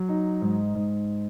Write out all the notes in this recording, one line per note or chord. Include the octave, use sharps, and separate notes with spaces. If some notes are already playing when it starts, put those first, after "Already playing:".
Already playing: F#3
D#4
G#2
G#2